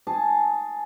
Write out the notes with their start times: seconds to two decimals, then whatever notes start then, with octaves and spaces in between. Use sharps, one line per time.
0.07 G#4 A5